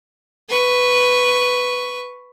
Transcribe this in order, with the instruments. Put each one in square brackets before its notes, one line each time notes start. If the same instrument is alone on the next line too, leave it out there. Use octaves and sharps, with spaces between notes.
[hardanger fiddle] B4 C#6